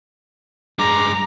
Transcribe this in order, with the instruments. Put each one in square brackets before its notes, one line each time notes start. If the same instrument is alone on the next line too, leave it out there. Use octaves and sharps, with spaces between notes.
[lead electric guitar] G2 G#3 [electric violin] A#5 [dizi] D6